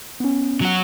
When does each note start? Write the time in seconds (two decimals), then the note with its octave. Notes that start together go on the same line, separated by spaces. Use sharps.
0.20 B3 C#4
0.61 F#3 F#4